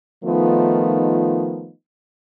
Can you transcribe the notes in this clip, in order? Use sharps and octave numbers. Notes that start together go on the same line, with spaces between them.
D#3 F3 A3 B3 D#4 F4